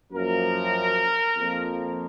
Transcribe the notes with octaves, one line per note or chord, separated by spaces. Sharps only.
F#2 F3 A#3 A#4
F2 F3 A#3